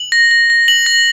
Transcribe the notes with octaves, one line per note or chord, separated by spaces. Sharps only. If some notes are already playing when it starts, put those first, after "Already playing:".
Already playing: F#7
A#6
A#6
A#6
F#7
A#6